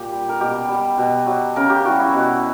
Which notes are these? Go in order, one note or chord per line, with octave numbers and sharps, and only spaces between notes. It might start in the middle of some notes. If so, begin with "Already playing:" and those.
Already playing: A#2 G4
G3
A#4
B2 G4
G3
B2
F#3
C#3 A#4
G4
E3 G3 F#4
E4
B2 F#4